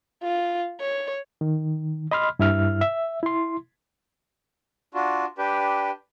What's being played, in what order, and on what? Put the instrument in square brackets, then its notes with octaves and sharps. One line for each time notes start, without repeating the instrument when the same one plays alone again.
[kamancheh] F4
C#5
[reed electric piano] D#3
D#5 B5 C6 F6
G2 E4 E5 F6
E5
E4 C6
[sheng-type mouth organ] D4 F4 F#4
D4 G4 B4 G5